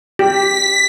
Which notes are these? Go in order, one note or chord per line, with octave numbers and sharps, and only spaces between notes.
G4 B6